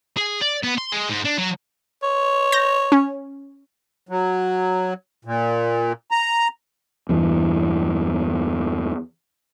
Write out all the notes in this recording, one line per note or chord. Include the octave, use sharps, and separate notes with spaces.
G#4
D5
B3
C6
G#3
G#2
D4
F#3
C#5
G6 A#6
C#4
F#3
A#2
A#5
E2 G2 E3